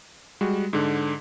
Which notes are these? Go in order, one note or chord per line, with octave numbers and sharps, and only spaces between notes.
G3 G#3 F#4
G#2 D3